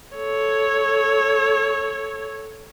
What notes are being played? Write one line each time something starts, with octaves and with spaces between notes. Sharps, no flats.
A4 C#5